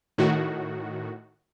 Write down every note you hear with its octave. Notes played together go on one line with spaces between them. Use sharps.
A2 D#3 F#4